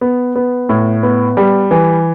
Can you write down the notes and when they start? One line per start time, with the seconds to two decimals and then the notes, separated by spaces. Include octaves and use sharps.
0.01 B3
0.35 B3
0.69 A2
1.03 B3
1.37 G3
1.71 E3